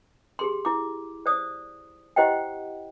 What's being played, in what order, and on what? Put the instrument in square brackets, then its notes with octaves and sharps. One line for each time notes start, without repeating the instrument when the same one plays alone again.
[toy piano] G4 G#4 C6
E4 D6
C5 D5 D#6
E4 G4 C5 D#5 F#5 G5